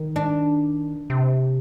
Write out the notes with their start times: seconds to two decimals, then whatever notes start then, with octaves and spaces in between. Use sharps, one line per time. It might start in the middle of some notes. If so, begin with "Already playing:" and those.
Already playing: D#3
0.16 D4
1.10 C3